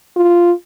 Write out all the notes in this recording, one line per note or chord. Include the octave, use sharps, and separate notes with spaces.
F4